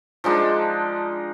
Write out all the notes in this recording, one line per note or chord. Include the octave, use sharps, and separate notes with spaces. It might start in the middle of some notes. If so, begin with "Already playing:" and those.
F3 G#3 D4 D#4